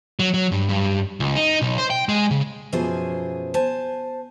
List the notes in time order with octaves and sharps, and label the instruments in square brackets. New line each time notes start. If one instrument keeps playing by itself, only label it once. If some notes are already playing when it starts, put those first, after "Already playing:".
[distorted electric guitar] F#3
F#3
G2
G2
C#2
D#4
B1
C5
G5
G#3
C#3
[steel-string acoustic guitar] F#2 B2 F3 G#4 C5 G#5
C5 G#5 A5